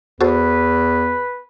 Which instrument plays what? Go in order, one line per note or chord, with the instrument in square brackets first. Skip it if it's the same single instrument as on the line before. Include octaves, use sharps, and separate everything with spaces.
[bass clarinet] E2 [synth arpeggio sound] F#4 A4 C5 [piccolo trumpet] B4